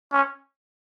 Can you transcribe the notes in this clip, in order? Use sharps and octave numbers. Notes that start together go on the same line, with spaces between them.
C#4